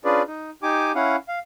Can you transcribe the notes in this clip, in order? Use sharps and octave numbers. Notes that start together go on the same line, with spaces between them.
C#4 D4 F4 G#4 B4 D5
D#4
D#4 G4 G#5 D6
C#4 E4 F5 F#5
F5